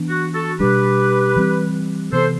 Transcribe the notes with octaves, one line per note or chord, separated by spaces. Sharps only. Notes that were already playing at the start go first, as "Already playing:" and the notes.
Already playing: E3 B3 D4
F#4
F#4 A4
B2 G3 D4 G4 B4
E3 G3 C4
C3 E3 B3 A4 C5